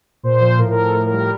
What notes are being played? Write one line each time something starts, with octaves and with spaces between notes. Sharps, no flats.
A#2 C5
F3 C5
A2 A#4
A#4
F3
A4
A2 A#4
A#4
G3
A#4